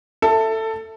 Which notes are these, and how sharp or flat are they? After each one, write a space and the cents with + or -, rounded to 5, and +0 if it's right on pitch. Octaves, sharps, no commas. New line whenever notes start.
A4 +15 E5 +0